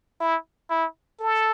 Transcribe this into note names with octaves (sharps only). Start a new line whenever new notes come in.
E4
E4
A4